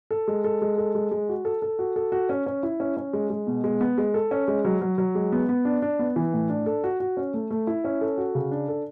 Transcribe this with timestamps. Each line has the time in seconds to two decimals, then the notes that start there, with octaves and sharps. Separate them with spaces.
0.11 A4
0.28 G#3
0.44 A4
0.62 G#3
0.78 A4
0.95 G#3
1.11 G#3
1.29 F#4
1.45 A4
1.62 A4
1.79 F#4
1.96 A4
2.12 F#4
2.29 C#4
2.46 C#4
2.63 E4
2.80 C#4
2.97 C#4
3.13 G#3
3.30 G#3
3.47 B2
3.64 G#3
3.81 B3
3.98 G#3
4.14 A4
4.31 C#4
4.48 G#3
4.65 F#3
4.81 F#3
4.98 F#3
5.15 G#3
5.32 B3
5.49 B3
5.65 D4
5.82 D4
5.99 B3
6.16 E3
6.33 A2
6.49 D4
6.66 A4
6.84 F#4
7.00 F#4
7.17 C#4
7.34 A3
7.51 A3
7.67 E4
7.84 C#4
8.01 A4
8.18 F#4
8.35 C#3
8.51 D4
8.68 A4